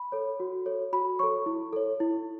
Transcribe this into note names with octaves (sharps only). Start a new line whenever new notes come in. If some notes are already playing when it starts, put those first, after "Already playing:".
Already playing: B5
A4 C#5
F#4
A4 C#5
F#4 B5
A4 C#5 C#6
E4
A4 C#5
E4